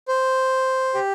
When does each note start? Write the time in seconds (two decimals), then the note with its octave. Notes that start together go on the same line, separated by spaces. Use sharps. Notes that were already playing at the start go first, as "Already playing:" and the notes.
0.08 C5
0.94 G4